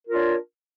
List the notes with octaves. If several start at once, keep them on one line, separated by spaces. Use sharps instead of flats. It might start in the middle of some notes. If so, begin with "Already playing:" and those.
D4 F4 A#4 C#5